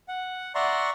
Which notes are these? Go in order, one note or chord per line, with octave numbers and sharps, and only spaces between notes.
F#5
D5 E5 F#5 A#5 C6 C#6